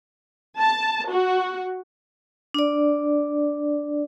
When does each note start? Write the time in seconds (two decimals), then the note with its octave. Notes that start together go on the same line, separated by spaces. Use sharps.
0.60 A5
1.10 F#4
2.54 D4 D5